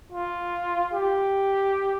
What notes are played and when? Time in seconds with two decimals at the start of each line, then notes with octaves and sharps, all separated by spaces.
0.12 F4
0.93 G4